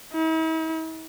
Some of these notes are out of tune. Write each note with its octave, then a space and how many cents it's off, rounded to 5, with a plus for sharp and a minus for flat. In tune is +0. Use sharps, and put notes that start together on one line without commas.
E4 -45